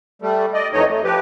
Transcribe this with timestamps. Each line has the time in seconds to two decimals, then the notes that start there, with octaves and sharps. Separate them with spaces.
0.22 G3 A3
0.54 D5 D#5
0.73 F2 E3 A3 D#4 C#5 D#5
0.89 A3
1.04 F3 G4 B4